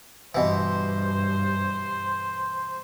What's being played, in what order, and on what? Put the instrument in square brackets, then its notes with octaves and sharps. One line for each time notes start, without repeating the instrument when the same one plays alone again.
[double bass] G2 [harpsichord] B2 E3 [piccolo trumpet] C5